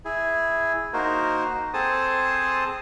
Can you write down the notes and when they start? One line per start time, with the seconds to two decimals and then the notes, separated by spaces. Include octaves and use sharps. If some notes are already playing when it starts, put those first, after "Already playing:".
0.05 E4 G#4
0.93 A#3 D#4 F#4 A#4 C5
1.74 C4 G#4 A4 C5 A5 D#6